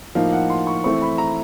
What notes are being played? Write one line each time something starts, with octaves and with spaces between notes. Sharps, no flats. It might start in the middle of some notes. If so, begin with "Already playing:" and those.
A2 F3 A#3 D#4 F5
F#5
C6
C#6
E3 A3 C4 C#6
B5
A#5